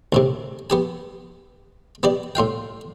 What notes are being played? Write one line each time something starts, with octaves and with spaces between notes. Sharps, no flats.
D2 A2 C3
B3 G4 G#5
B3 G4 D5
A2 F4 F5 G5